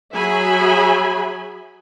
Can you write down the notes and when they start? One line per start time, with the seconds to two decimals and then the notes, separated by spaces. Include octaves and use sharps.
0.13 F#3 G#4 E5 G#5 B5